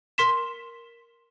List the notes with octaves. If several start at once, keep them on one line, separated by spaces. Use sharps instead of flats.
A#4 C6 B6 E7